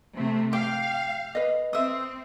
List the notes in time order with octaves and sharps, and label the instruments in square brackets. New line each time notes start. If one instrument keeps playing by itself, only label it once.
[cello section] C3 A3
[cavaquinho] G4 [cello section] F5 [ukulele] G5
[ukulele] B4 D#5
[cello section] C4 [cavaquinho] E5 D#6